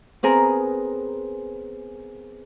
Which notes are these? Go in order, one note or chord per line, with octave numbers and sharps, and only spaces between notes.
B3 C4 G#4 A#4